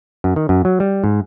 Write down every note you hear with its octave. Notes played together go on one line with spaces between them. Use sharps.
F#2
D#3
F#2
F#3
G3
G#2